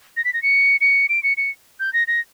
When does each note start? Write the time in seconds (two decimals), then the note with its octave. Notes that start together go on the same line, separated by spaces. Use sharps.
0.17 A#6
0.24 B6
0.33 A#6
0.43 C#7
0.81 C#7
1.09 D7
1.23 C#7
1.37 C#7
1.80 G6
1.93 A#6
2.07 A#6